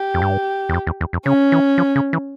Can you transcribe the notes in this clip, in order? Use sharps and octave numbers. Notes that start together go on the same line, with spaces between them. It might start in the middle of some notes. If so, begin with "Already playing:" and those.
Already playing: G4
F2
G2
E2
F2
E2
E2
F2
C#3 C#4
E3
F3
C#3
E3